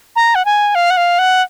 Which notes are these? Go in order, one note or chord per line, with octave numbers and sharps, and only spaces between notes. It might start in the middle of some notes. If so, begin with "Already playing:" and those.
A#5
F#5
G#5
F5
F#5
F5
F#5